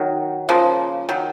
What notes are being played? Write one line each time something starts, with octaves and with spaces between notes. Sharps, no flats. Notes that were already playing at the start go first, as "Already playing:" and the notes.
Already playing: D#3 F#3
C#3 F3 A#3
D#3 F#3